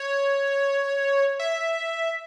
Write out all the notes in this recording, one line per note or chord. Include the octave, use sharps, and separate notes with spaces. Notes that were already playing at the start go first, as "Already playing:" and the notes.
Already playing: C#5
E5